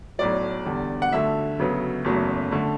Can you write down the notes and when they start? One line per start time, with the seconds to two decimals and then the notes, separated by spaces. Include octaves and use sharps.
0.19 B1 A2 F#3 D5
0.66 E2 D3 G3
1.02 F#5
1.12 D2 D3 A3 E5
1.59 D2 C#3 F#3 B3
2.05 F#1 E2 C#3 F#3 A3
2.51 D3 A3